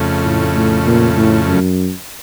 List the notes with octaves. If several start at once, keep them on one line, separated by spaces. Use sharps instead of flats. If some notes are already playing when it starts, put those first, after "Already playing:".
Already playing: F2 C#3 A3
A2
A2
A#2
A2
F#2